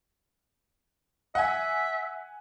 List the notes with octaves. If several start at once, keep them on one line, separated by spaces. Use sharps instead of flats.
E5 F#5 G#5